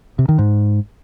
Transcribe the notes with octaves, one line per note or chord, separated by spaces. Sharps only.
C3
D#3
G#2